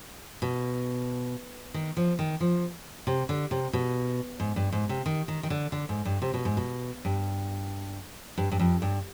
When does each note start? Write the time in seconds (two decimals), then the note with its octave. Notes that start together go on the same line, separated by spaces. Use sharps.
0.42 B2
1.74 D#3
1.97 F3
2.19 D#3
2.40 F3
3.07 C3
3.29 D3
3.51 C3
3.73 B2
4.40 G#2
4.56 G2
4.72 G#2
4.89 C3
5.06 D#3
5.28 D#3
5.43 D#3
5.50 D3
5.72 D3
5.89 G#2
6.05 G2
6.22 C3
6.34 B2
6.45 G#2
6.57 B2
7.05 G2
8.38 G2
8.52 G2
8.60 F2
8.82 G2